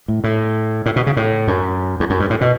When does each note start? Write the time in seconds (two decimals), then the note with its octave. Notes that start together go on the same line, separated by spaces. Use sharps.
0.08 A2
0.24 A2
0.86 A2
0.96 B2
1.07 C#3
1.17 A2
1.48 F#2
2.00 E2
2.10 F#2
2.20 G2
2.30 A2
2.41 B2